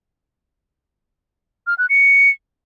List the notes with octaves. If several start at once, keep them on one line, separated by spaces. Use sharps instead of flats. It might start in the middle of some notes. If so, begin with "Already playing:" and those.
F6
F#6
C#7